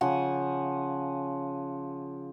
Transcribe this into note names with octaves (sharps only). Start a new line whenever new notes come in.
C#3 F3 F#5 G#5